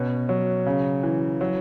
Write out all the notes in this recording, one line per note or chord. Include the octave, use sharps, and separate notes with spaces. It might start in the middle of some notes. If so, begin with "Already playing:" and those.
Already playing: B2 C#4
F#3
C#3
E3
F#3